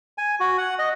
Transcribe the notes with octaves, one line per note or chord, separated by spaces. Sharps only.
G#5
F#4
F#5
D#5